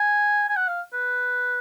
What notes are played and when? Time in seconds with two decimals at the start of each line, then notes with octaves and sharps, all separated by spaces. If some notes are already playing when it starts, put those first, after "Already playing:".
Already playing: G#5
0.49 G#5
0.56 F#5
0.68 F5
0.93 B4